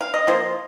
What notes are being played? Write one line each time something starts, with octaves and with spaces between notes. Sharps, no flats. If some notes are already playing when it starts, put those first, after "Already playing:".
F5
D#5
F3 A#3 F4 C5